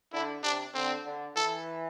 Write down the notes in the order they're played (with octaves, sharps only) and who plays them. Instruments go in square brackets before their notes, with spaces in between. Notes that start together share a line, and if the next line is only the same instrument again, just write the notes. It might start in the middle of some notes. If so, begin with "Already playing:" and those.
[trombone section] D3 [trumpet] E4
[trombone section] C3 [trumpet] D4
[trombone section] D3 [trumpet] C4
[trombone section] D3
[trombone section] E3 [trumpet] A4